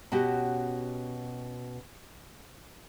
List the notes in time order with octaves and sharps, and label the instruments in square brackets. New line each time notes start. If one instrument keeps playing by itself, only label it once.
[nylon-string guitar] B2 C#4 F#4 G4